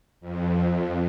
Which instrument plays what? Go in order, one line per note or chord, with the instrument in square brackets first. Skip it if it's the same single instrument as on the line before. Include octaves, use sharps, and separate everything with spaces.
[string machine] F2